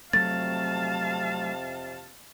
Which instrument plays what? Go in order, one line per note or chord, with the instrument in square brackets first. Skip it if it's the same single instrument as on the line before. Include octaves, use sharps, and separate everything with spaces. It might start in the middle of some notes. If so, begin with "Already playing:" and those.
[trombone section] F2 C3 [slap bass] F#3 A3 [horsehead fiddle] F5 A5 [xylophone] A6